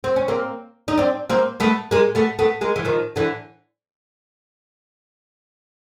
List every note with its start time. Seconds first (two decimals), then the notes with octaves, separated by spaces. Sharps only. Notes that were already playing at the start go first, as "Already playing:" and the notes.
0.04 C4
0.16 C#4
0.28 A#3 C4
0.88 D#4
0.97 C4 D4
1.30 A#3 C4
1.60 A3 B3
1.91 G#3 A#3
2.15 A3 B3
2.39 A3 B3
2.61 G#3 A#3
2.76 E3
2.85 D#3 F3
3.16 D3 E3